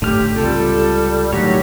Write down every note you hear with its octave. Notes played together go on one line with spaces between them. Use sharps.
G#1 A2 D3 A3 G4 F6
C#2 C3 G3 F4 G4 A4
A2 D3 D#3 F#3 F#4 G4 C#5